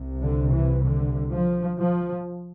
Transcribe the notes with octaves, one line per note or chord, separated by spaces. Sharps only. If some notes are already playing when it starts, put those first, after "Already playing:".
Already playing: C2 C3
D3
E3
D3
F3
F3